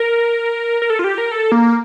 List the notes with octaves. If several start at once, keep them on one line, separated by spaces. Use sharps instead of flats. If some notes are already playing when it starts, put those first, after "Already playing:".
Already playing: A#4
A#4
A4
F4
G4
A#4
A4
A#3